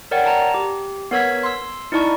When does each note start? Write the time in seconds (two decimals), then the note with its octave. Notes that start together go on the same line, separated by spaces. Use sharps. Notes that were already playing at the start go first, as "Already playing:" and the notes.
0.11 A#4 C#5 D5 F#5 G5
0.26 A5 A#5
0.54 G4
1.11 B3 A#4 C#5 E6 G#6 B6
1.43 C6 E6
1.92 D#4 E4 D5 A5 C#6